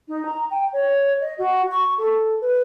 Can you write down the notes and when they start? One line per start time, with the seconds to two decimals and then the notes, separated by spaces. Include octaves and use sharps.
0.08 D#4
0.25 A#5
0.50 G5
0.72 C#5
1.20 D#5
1.38 F#4
1.70 C#6
1.98 A4
2.41 B4